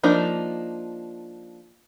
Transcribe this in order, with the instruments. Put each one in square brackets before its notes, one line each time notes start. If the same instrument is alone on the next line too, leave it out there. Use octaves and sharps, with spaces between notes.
[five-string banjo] F3 A#3 D4 D#4